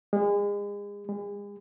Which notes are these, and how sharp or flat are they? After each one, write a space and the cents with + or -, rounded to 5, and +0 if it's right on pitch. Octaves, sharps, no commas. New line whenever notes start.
G#3 -35
G#3 -40